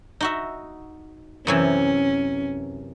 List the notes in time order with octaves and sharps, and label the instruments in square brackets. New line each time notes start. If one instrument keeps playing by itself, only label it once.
[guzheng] D#4 F#4 E5
[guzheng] F#2 C3 E3 [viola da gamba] C#4